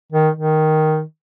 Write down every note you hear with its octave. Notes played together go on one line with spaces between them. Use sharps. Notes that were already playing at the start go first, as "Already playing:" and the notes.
D#3
D#3